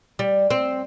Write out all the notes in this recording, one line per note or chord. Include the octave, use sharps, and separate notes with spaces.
G3
C4